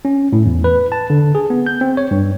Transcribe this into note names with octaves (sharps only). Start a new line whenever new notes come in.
C#4
A2
E2
B4
A5
D3
G#4
B3
G6
C4
C#5
G2